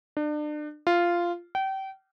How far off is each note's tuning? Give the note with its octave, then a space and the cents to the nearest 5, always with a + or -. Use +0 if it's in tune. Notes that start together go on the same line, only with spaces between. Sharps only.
D4 +35
F4 -10
G5 -30